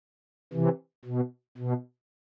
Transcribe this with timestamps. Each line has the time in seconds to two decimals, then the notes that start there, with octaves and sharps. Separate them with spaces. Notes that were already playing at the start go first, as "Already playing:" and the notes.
0.53 C3 E3
1.05 B2
1.58 B2